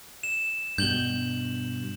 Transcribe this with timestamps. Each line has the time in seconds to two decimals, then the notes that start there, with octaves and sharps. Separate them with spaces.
0.23 E7
0.78 G2 B2 G6 F#7 G7